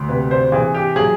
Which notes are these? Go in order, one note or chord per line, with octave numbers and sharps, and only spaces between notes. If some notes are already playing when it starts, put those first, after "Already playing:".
Already playing: D2
C3 B4
C5
E3 G#4
G4
F#3 G#4